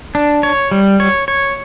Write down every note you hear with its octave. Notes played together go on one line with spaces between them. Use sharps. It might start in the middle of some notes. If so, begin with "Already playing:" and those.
D4
C#5
G3
C#5
C#5